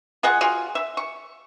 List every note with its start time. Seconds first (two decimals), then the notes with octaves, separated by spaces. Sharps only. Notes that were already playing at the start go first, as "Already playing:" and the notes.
0.23 F4 G#4 D#5 F#5
0.41 F4 F#4 G#4
0.75 E5
0.97 C#6